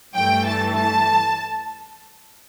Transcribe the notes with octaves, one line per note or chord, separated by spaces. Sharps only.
G2 E3 A3 G5
A5
A5